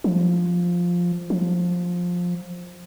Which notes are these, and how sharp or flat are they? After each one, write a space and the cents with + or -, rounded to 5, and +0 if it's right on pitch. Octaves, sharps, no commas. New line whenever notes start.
F3 +5
F3 +15